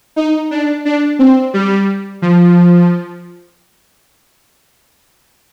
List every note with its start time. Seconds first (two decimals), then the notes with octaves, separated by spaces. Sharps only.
0.16 D#4
0.51 D4
0.85 D4
1.19 C4
1.54 G3
2.22 F3